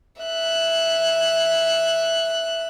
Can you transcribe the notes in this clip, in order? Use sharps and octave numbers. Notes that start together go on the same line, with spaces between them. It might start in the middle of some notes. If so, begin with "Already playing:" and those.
E5 F#6